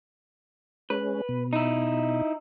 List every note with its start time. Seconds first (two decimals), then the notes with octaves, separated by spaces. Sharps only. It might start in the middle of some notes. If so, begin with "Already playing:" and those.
0.90 G#3 C#4 B4
1.29 B2
1.53 D#4 E4